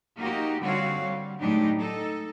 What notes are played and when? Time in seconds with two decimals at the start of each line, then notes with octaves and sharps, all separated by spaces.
0.17 A#3 D#4 F#4 G4
0.60 D3 G3 C4 F#4 C#5 F5
1.04 G3
1.40 A2 F#3 G#3 D4 D#4 G4
1.78 D#4 A4